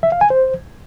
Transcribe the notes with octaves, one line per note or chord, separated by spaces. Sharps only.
E5
F5
G#5
C5